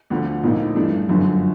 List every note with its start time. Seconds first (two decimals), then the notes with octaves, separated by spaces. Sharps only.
0.10 D2 D3 F3
0.44 A#1 A2 F3 A#3 D#4
0.75 G2 E3 A3 D4
1.09 G1 F#2 D3 F3